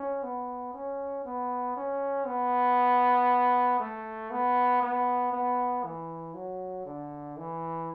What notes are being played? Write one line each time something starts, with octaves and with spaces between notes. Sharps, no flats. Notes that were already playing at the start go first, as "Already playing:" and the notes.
Already playing: C#4
B3
C#4
B3
C#4
B3
A3
B3
B3
B3
E3
F#3
D3
E3